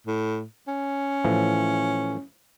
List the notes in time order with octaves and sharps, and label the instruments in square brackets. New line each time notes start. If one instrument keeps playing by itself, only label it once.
[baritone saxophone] A2
C#4
[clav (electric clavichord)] A2 E3 F3